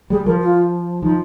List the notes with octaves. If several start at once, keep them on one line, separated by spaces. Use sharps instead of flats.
G3 G#4
F3 A#4
F4
F3 D#4